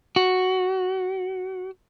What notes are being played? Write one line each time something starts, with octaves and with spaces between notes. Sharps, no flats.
F#4